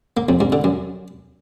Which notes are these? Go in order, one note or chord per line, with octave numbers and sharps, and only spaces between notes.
A#3
F2
G2
D3
F#2